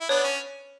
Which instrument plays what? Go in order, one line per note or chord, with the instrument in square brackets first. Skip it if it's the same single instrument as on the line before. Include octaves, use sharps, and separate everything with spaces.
[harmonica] E4
[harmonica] B3 D4 [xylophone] C#5
[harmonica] C#4